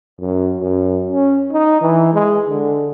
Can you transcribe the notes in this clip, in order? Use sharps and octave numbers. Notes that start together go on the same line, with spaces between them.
F#2
F#2
C#4
D#4
E3
G#3
D3